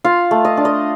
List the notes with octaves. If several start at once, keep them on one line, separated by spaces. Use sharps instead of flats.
F4 F5
A3
D#5
D4
D#5